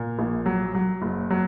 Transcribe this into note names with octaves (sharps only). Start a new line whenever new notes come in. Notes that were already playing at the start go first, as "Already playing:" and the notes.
Already playing: A#2
A#1
F#3
F#3
F#1
F#3